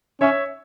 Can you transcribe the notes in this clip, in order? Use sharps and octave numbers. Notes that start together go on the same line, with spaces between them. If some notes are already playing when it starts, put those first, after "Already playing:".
C#4 C#5 E5